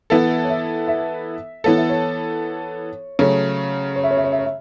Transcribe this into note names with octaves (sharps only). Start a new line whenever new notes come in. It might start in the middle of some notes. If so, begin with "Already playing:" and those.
E3 B3 E4 A4 E5
C#5
E5
E5
E3 B3 A4 C#5
E5
C#5
C#3 F#3 A3 C#4 C#5
C#5
E5
C#5
E5
C#5
E5
C#5
E5